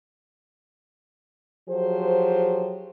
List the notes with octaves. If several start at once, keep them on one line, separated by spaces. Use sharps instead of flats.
F3 F#3 G4 G#4 C5